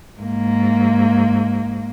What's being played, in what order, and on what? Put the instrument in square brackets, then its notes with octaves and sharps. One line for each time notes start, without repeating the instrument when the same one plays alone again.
[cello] G#2 A#3